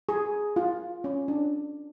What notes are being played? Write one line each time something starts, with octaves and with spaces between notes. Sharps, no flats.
G#4
F4
C#4
D4